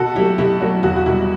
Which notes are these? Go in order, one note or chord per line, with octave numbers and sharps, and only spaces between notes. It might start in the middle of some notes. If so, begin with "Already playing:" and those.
Already playing: B2 F#4 A4
F#3 A3 E4 G4
B2 E4 G4
F#3 A3 F#4
E2 F#4
F#4
B2 G3 E4